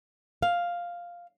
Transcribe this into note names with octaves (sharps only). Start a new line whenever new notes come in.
F5